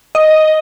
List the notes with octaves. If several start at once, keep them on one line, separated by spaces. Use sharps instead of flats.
D#5